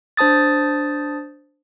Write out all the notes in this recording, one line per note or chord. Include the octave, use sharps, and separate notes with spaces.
D4 C5 A5 D#6 A6